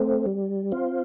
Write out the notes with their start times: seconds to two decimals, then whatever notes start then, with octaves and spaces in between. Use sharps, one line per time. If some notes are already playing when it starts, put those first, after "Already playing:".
Already playing: A3 C4
0.26 G3
0.72 C4 F4